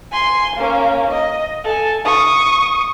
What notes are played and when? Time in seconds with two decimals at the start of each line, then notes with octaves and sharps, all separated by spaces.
0.12 G#5 C6
0.56 A#3 C#4
1.11 D#5
1.64 A4 G#5
2.05 C#6 D#6